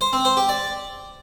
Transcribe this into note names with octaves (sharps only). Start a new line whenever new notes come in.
C5
C4
C5
G4
D5